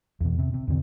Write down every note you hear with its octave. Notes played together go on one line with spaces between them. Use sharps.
E2 B2
C3
C3
E2 D3 C4